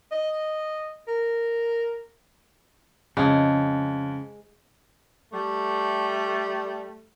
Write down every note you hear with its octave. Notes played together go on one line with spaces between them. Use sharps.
D#5
A#4
F2 C#3 G#3
G3 A3